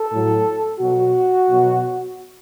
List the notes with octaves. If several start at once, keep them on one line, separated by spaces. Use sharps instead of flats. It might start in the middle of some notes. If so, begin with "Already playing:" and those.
Already playing: A4
A2 F#3
B2 F#3 F#4
B2 F#3